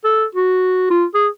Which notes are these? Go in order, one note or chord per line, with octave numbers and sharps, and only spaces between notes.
A4
F#4
F4
G#4